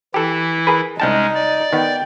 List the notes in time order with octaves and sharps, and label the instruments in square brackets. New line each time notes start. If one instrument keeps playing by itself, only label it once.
[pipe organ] E3 E4 [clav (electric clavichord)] G4 A4
[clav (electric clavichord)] G#4 A#4 B4
[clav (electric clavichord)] C2 G5 A5 [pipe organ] G#3 C#4 [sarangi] D#4
[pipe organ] D5
[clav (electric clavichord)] D#3 B3 [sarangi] G5